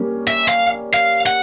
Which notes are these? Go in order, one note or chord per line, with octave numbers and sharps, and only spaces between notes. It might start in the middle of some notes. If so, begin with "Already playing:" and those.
Already playing: G3 A#3 C#4
E5
F5
F5
F#5